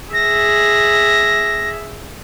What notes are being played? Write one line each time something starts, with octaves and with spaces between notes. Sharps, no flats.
G#4 E5 A#6